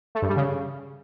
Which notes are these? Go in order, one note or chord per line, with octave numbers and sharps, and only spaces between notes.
A3
G2
G3
C#3